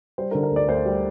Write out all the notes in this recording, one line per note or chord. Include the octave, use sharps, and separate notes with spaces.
G3 C5
A#4
D3
A#4
D2 D5
D2 C5
G3